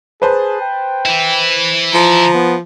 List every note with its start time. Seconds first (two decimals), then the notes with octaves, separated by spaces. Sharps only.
0.22 G#4 B4 C5 A5
0.61 G5
1.06 E3 E4
1.94 F3 A#5
2.34 B3